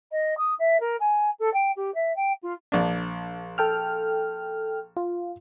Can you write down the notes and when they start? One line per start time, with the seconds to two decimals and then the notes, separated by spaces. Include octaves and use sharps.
0.11 D#5
0.37 D#6
0.59 E5
0.80 A#4
1.00 G#5
1.39 A4
1.53 G5
1.76 G4
1.94 E5
2.16 G5
2.42 F4
2.72 A#1 D4
3.58 A4 G5 F6
4.97 F4